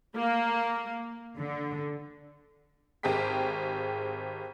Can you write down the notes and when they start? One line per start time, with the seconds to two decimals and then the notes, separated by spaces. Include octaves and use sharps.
0.17 A#3
1.37 D3
3.03 G#1 G4 G#4 G5 B6